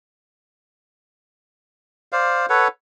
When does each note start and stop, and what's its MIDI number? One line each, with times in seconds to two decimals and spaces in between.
2.12 2.46 72
2.12 2.46 74
2.12 2.46 77
2.50 2.68 69
2.50 2.68 71
2.50 2.68 73
2.50 2.68 78